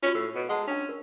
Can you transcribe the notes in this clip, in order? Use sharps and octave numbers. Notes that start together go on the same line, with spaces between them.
C#4 F4 F#4
A2 C#6 E6
B2
G#3 F#5 A5 A#5
C#4 D4 G5
A#4